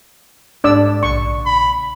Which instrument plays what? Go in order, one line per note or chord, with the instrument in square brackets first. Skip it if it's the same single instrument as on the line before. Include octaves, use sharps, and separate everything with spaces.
[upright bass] G#2 [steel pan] D4 D5 E6
[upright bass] A#1 C#3 [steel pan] C#6
[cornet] B5